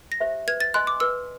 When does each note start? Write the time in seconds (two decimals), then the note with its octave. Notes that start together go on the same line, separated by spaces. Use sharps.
0.12 A#6
0.20 G4 C5 E5
0.47 B4 G#6
0.60 A6
0.74 D#5 G#5 C6 F#6
0.87 D6
1.00 B4 E6